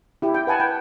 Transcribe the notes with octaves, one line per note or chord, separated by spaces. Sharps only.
E4 G4
G5
B4 F#5 G#5 A5
G5